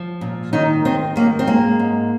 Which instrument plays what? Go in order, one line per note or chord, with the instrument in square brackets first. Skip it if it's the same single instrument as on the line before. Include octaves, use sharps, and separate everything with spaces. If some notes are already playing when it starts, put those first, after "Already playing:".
Already playing: [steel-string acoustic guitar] F3
A#2
D#3 D#4
D#3 C4
D#3 A#3
C4
G#3 A#3
G#2